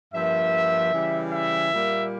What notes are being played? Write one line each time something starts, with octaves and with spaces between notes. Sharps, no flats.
G2 F3 A#3 E5
C#3 E3 G3
E5
A#2 G3 A#3